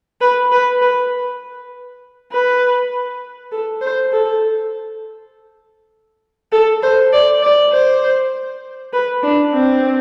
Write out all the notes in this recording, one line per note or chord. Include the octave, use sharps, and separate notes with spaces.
B4
B4
B4
B4
A4
C5
A4
A4
C5
D5
D5
C5
B4
D4
C4